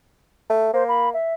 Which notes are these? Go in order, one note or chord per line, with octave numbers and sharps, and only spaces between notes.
A3
A#3 C5
B5
E5